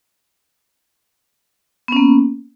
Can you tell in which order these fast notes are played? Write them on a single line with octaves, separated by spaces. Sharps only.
B3 C#4 A#3